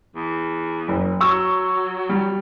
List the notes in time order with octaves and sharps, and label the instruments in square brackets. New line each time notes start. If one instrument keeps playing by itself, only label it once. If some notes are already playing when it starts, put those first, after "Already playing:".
[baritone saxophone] E2
[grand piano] F#1
[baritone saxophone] F#3 [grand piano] C#6 E6
[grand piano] G3